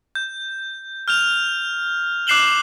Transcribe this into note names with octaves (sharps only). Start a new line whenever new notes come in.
G6
F6 G6 F7
D6 F#6 C7 E7 F#7 G7